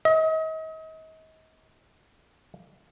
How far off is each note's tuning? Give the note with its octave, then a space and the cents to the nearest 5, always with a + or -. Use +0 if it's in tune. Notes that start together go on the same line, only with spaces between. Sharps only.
D#5 +40